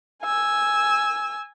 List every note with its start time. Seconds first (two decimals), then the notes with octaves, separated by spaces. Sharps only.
0.23 G#5 E6